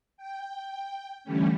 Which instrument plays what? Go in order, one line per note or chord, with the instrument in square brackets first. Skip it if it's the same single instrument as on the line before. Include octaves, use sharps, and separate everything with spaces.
[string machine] G5
D3 E3 G3 A3 C#4